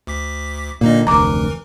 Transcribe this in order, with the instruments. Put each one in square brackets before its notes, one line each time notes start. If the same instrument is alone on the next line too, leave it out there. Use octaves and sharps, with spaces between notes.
[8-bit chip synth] D2 D6 B6
[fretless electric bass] A#2 D3 [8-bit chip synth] A#3 D#4 D#5
[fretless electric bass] F1 D2 [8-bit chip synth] E3 A#4 [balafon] A#5 D6